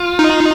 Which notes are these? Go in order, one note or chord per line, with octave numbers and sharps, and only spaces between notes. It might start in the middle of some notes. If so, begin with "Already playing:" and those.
Already playing: F4
D#4